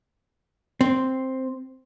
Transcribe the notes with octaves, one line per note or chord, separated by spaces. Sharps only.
C4